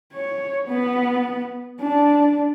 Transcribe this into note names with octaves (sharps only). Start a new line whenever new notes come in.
C#5
B3
D4